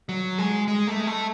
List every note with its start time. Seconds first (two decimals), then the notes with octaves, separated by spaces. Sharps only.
0.09 F#3
0.38 G#3
0.68 G#3
0.87 A3
1.00 G#3
1.07 A3